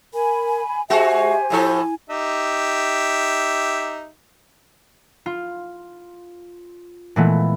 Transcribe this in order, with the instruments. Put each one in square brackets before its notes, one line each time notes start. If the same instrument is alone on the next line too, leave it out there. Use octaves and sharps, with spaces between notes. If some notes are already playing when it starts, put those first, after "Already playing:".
[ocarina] A#4 [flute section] G#5 B5
[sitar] G#3 F#4 [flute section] G4 C5 [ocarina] E5 [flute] G#5
[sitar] A2 F3 A4 [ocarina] E4
[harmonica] D#4 G4 E5
[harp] F4
A#2 E3 G#3 A3 B3